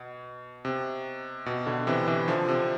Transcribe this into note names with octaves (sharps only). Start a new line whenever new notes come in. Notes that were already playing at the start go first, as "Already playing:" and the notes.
Already playing: B2
C3
B2
B2 D3
C3 E3
C3 E3
D3 F3
C3